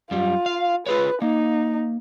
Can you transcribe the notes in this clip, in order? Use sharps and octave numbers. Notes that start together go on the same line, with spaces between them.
F#2 G3 F4
F5
F4 G#4 B4 C#5
A#3 D#4